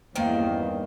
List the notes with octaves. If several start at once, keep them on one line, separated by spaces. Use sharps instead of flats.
E2 G2 D#3 A#3 C#4 C5 F5 G5